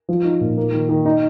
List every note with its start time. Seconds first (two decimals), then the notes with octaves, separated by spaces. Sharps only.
0.09 F3
0.24 D#4
0.41 A#2
0.57 A#3
0.73 D#3
0.89 D#3
1.06 D#4